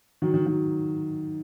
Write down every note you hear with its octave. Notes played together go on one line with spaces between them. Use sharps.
D#3 F#3
D#3 F#3
D#3 F#3